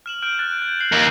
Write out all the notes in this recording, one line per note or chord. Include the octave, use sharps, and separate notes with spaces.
F6 E7 F#7
F6 G6 D7
F#6 A6
G6
F#6 C7 F#7
D#2